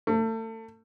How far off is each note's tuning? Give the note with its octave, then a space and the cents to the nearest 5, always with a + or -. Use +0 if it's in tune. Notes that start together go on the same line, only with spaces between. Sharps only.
A3 +30